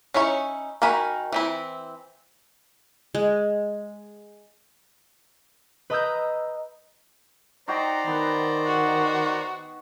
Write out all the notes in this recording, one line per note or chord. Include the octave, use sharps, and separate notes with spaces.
C#4 D#4 E4 C#5
D#3 F#4 A#4 G#5 B5
E3 C4 E4
G#3
B4 D#5 A#5 D#6 E6 G6
D#4 F#4 C5 D5 G5 A#5
D#3 B3
F#4